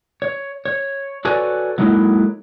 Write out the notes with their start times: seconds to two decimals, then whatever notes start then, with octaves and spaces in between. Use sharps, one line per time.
0.22 C#5
0.65 C#5
1.25 F#4 A4 B4 C#5 D5 G#5
1.78 F#3 G#3 A#3 D#4 E4 A4